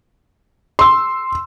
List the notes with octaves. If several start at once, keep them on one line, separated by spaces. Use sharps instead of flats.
C6 E6